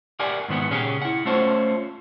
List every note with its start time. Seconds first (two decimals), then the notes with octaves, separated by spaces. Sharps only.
0.19 G4 A#4 D5 F#5 G#5
0.48 G#2 D#3 B3 F#5
0.71 A#2 C#3 C#4 G4 G#4
1.02 E4 F#5
1.25 A3 C#4 F4 A4 C5 C#5